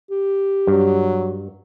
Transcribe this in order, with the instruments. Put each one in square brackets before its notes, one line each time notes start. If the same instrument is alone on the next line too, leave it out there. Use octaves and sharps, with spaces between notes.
[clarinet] G4
[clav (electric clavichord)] G2 [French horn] F#3